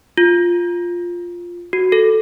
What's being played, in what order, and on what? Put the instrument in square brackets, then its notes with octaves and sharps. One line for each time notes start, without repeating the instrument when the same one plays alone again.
[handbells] F4
F#4
A4